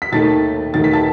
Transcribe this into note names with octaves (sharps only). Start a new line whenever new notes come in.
B6
D#2 D#3 A3 D#4 A5 A6
D#2 D#3 A3 D#4 A6
B6
A5 A6